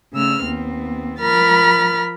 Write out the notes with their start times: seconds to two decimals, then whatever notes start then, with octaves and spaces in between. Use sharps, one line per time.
0.13 C#3 A3 E6 F6
0.44 D#2 B3 C4
1.19 F3 A#4 B5 F6 A6